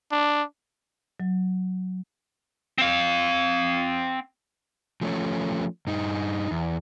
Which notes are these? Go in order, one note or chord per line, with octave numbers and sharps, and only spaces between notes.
D4
F#3
C4 F5
F3 A3 C#4
G2 D#4
E2